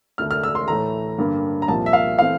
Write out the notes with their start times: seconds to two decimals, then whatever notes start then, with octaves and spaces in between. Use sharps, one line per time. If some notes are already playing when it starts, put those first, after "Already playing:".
0.18 D2 D3 A3 F6
0.31 F6
0.44 E6
0.55 C6
0.68 A2 E3 A3 A#5
1.18 G2 D3 G3 A#3
1.62 A#5
1.68 C2 A#2 F3 A#3 A5
1.86 E5
1.93 F5
2.19 E3 A3 C4 F5